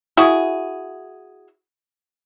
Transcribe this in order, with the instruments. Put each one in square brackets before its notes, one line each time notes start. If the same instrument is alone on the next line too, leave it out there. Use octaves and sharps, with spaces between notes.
[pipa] E4 F#4 G#4